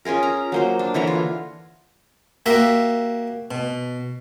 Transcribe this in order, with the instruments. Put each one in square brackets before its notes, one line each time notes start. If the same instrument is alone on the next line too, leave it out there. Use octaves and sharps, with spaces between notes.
[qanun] C#4 F4 G#4 A#4
A#5
F#3 A#3 C5
D4
D3 E3 C#5 A#5
F4
[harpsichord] A#3 F#4 G4 E5
B2